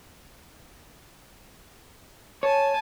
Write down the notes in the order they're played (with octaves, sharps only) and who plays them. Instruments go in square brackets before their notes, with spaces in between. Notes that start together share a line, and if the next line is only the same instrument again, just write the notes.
[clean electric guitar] C#5 [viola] G#5 A5